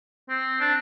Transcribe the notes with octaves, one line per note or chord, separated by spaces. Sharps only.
C4
D4